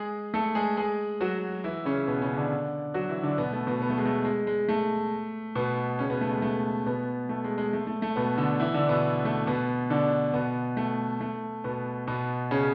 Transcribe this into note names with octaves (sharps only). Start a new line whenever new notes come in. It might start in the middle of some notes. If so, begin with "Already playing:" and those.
Already playing: G#3 G#4
A3 A4
G#3 G#4
G#3 G#4
F#3 F#4
E3 E4
C#3 C#4
B2 B3
C#3 C#4
D3 D4
F#3 F#4
E3 E4
D3 D4
B2 B3
A3
B2 B3
B3
A3
G#3
A3
G#3
G#3
A3
B2 B3
C#3 C#4
B2 B3
A3
G#3
A3
B2 B3
A3
G#3
G#3
A3
A3
A3
B2 B3
D3 D4
E3 E4
D3 D4
B2 B3
A3
B2 B3
D3 D4
B2 B3
A3
A3
B2 B3
B2 B3
C#3 C#4